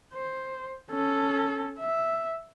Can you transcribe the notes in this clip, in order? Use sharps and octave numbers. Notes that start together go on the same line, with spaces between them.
C5
C#4 A4
E5